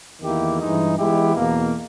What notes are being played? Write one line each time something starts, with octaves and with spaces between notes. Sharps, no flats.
E2 D#3 A#3 E4 G4
G2 E3 G#3 D#4
E3 G#3 B3 E4 G4
E2 B2 A#3